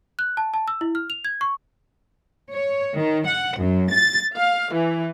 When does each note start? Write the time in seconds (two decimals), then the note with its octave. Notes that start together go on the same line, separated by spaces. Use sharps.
0.19 F#6
0.37 A5
0.54 A5
0.68 E6
0.81 E4
0.95 F6
1.10 F7
1.25 G#6
1.41 C#6
2.53 C#5
2.96 D#3
3.26 F#5
3.58 F#2
3.92 A6
4.36 F5
4.71 E3